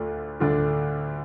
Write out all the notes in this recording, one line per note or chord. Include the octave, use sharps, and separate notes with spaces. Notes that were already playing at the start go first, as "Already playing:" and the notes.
Already playing: D2 D3 A3 D4 F4
D2 D3 A3 D4 F4